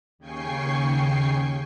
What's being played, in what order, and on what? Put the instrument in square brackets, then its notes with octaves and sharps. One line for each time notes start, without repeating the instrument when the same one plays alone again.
[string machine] D#2 C#3 G5 G#5 C#6 C7